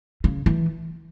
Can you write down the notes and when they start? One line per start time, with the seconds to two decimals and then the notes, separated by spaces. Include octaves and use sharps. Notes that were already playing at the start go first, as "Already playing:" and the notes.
0.24 C#3
0.46 E3